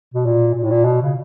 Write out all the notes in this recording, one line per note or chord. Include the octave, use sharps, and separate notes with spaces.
B2
A#2
A#2
A2
A#2
B2
C#3